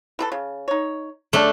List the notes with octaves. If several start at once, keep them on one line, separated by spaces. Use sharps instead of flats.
E3 G#4 A4
C#3
D#4 C#5
A3 C#4 D4 D5 A5